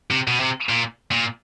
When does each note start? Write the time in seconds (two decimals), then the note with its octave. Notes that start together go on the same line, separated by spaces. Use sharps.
0.11 C3
0.28 B2
0.40 C3
0.69 A#2
1.11 A#2